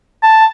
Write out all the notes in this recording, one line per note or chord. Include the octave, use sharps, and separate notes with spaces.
A5